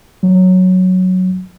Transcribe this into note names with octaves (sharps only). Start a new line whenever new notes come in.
F#3